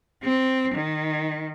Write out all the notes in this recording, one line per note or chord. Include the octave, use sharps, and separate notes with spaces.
C4
D#3